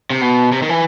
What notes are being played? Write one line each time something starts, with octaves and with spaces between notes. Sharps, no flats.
C3
B2
C3
D#3
E3